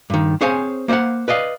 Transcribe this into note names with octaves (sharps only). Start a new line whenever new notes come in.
G2 D#3
C4 G#4 C5 C#5 F5 G#5
A#3 C5 D5 F5 F#5
B4 D5 D#5 F5